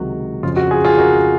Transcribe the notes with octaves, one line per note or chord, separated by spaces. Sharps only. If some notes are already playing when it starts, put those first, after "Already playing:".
Already playing: C#2 C3 D#3 F#3 F#4
F2 C#3 F3 F4
F#4
F4 G#4
F4 G#4
F#4 A#4